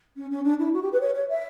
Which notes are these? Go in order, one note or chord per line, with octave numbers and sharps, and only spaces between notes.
C#4
C#4
D4
E4
F#4
G4
B4
C#5
C#5
E5